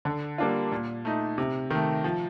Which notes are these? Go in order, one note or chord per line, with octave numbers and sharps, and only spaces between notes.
D3
G3 A#3 D4 F4
A#2
A3 D#4
C3
D#3 A3
F3